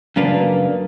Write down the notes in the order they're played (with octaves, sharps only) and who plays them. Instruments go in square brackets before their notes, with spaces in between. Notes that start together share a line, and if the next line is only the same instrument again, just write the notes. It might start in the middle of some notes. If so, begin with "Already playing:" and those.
[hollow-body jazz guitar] F#2 C#3 A#3 D4 B4